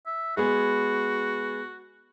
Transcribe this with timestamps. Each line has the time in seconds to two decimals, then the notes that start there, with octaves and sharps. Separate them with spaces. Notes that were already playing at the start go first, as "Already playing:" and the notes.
0.06 E5
0.37 G#3 B3 F#4 G#4